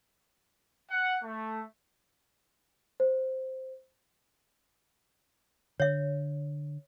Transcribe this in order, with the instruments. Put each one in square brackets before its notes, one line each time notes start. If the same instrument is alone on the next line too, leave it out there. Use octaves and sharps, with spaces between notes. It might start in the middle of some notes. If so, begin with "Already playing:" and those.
[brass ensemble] F#5
A3
[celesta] C5
[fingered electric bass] D3 [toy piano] C#5 E5